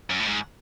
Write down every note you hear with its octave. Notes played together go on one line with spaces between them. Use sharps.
F#2
A2
G#2